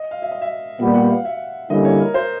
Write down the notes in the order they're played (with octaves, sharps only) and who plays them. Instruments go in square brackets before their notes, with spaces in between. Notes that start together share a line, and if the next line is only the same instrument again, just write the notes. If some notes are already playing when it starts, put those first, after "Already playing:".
Already playing: [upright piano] D#5
F5
E5
D#5
E5
[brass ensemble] A#2 G3 B3
[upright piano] F#5
F5
E5
[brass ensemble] D3 G3 A#3 C#4 E4 [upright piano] D#5
[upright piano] C#5
A#4
C5